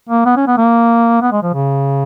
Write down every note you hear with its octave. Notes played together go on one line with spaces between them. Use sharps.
A#3
B3
C#4
B3
A#3
B3
G#3
F3
C#3